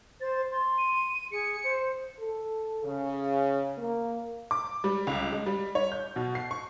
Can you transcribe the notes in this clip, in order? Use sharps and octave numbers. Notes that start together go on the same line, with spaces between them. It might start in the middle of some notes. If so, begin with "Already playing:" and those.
C5 A6
C6
D#7
G#4 C#7
C5
A4
C#3
A#3
D6
G3
C#2
G#3
G3
C#5
G6
B2
C7
C#6